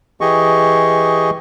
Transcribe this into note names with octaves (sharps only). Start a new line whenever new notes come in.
E3 G4 G#4 D#5 C#6